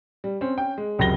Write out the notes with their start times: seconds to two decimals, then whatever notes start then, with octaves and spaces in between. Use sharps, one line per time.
0.24 G3
0.41 C4 C#4
0.58 C#4 G5
0.78 G#3
0.98 F#1 C#2 F#2 C3 A#6 G7